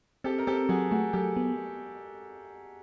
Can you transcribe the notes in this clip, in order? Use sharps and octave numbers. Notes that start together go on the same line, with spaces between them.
C4 G4 A4
A#4
C4 G4 A4
F#3 F#4 G#4
A3 F#4 G#4
F#3 G4 A4
B3